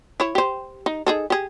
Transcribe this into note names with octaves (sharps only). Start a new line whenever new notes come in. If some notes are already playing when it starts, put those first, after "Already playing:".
E4 C#5
G4 C5
D#4
D#4 G#4 A4
G4 G#4